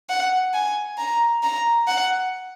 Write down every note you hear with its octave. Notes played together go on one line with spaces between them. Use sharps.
F#5
G#5
A#5
A#5
F#5